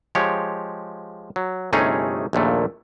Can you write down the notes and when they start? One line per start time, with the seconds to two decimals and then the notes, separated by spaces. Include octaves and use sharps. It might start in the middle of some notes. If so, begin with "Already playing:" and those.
0.15 F3 G#3 G4 C#5
1.36 F#3
1.73 G1 C3 A3 C#4 D#4 G#4
2.33 A#1 D#2 A#2 A3